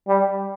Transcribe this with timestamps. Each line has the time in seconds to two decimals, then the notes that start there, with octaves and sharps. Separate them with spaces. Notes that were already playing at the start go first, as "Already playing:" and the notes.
0.08 G3